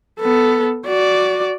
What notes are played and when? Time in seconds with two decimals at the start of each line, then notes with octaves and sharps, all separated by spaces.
0.20 B3 A4
0.86 F#4 D5